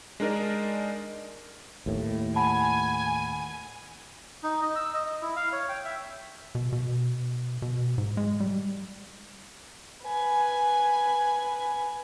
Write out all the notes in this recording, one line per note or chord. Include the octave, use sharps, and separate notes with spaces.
G#3 D4 D#4 A#4 D5 D#5
D#2 A2
F#5 G#5 A5 B5
D#4
D#5
E6
D#5
D#5
E4
F5
C#5
G5
E5
B2
B2
B2
G#2
G#3
G3
B4 G#5